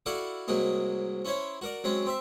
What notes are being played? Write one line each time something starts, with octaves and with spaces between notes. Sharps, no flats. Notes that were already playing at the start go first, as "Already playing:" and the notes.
E4 F#4 A4 D5 F5 F#5
C2 G#2 F#3 A#3 D#4
C#4 E4 C5 C#5
F#4 A#4 D5
F#3 G#3 C4 C#4
C4 E5